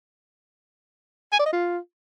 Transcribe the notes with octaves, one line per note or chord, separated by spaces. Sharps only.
G#5
D5
D#5
F4